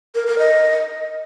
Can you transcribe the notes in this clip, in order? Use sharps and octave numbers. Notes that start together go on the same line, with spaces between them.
A#4
A#4
D#5